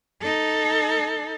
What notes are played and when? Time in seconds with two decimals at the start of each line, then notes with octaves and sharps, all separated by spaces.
0.21 D#4 A4